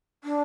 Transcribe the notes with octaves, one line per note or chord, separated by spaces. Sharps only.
D4